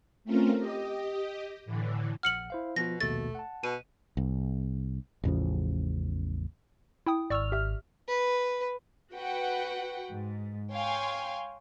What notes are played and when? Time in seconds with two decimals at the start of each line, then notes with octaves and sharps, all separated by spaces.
0.25 A3 C4 C#4 F4 A#4
0.58 G4 D#5
1.65 A2 D3 E3
2.23 A#1 F#5 F6 C#7 F#7
2.50 E4 C5 F5
2.76 B2 F3 B3 F4 A#6
3.00 A#1 D#2 B2 A3 A6
3.35 F#5 A5
3.64 B2 D#7
4.17 C2
5.24 A1 E2 C#3 F3
7.06 E4 G5 D#6
7.30 G#1 D5 C#6 E6 F6
7.52 G4 E5
8.08 B4
9.14 F#4 B4 F#5 G5
10.11 G#2
10.72 C#5 F5 G5 G#5 C6